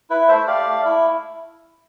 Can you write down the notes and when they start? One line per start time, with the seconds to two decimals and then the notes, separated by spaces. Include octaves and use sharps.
0.10 E4 B4
0.28 A3 C5 E5
0.47 G4 D5 F5
0.67 A3
0.85 E4